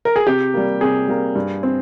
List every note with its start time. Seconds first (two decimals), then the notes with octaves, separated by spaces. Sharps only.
0.05 A#4
0.16 G#4
0.27 C3 G4
0.54 G3 A#3
0.81 C3 G#4
1.08 G3 A#3
1.35 G2
1.63 C4